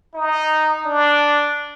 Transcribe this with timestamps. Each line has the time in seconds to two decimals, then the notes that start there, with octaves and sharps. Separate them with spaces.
0.14 D#4
0.85 D4